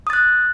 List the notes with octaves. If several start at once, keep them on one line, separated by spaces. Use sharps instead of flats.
D#6 F#6 A6